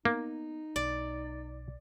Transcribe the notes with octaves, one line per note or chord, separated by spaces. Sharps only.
A#3 B3 D#4
B1 D5